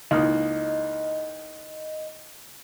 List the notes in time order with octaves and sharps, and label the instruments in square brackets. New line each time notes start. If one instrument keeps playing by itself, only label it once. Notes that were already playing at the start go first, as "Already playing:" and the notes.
[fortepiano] C#2 A#3 F6 [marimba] D#4 E4 [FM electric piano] D#5